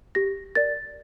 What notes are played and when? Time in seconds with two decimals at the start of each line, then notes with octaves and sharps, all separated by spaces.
0.15 G4 A#6
0.55 A#4 D5 A6